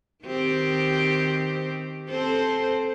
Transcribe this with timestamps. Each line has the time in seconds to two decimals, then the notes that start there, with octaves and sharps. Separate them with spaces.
0.25 D#3 C4 G4
2.10 C4 A4 C5